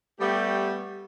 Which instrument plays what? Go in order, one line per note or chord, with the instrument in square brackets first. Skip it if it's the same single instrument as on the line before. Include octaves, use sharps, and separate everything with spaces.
[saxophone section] G3 A3 B3 G4